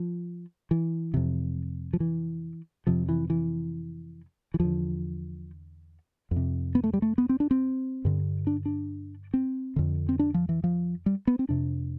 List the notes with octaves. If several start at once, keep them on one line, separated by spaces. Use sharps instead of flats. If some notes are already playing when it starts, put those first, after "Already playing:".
Already playing: F3
E3
F2 C3
F3
E3
F2 C3 F3
E3
E3
E3
E2 D3 F3
F2
C3
B3
A3
G3
A3
B3
C4
D4
C4
G2 D3
D4
D4
C4
F2 D3
C4
D4
F3
E3
F3
G3
B3
C4
F2 C3 D4